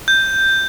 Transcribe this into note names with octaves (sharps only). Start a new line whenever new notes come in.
G6